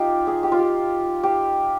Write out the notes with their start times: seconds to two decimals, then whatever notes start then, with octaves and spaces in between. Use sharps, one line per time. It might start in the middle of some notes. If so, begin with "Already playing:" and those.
Already playing: D#4 F4 G4
0.27 G#4
0.43 G4
0.52 F4
0.59 G4
1.23 G4